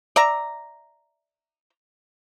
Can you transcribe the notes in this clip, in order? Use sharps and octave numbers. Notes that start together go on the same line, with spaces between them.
D5 E5 A#5